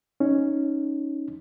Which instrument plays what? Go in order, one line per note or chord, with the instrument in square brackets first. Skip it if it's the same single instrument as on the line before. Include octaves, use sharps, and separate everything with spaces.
[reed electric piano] C#4 D#4